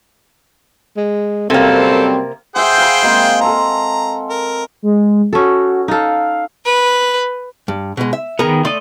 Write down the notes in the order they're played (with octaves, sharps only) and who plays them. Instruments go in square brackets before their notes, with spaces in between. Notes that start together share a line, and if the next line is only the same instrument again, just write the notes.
[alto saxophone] G#3
[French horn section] F#2 G3 C4 [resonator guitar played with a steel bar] C3 A#3 [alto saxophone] A4
[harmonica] G#4 C5 G5 [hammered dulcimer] E5 F#5
[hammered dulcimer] F5 G#5 B5
G#3 A#3 C4
[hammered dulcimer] A4 C6 [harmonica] A#5
[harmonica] A#4
[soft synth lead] G#3
[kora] C#4 A4 [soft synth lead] F#4
[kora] D#4 A4 [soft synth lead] F5
[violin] B4
[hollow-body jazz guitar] G2
B2 G#3
E5
[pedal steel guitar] D#3 B3 [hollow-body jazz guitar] G#4 A#4
[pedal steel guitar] A3 D#5 [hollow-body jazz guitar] D5 C6